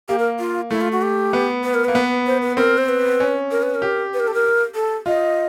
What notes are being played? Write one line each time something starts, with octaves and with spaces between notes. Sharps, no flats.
A#3 G4
A#4
F4
A3 E4
F4
F#4
G4
B3
B4
A#4
A#3 B4
B3
C5
B4
C4 A#4
C5
B4
C#4
A#4
B4
A#4
G4
B4
A#4
A4
A#4
A4
F4 D#5